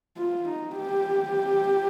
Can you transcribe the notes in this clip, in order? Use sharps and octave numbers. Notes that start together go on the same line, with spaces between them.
F4
D#4
G4